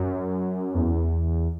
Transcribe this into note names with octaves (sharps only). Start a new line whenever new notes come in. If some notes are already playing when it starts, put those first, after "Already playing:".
Already playing: F#2
E2